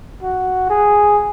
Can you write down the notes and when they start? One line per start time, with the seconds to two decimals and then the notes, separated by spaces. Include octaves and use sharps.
0.23 F#4
0.70 G#4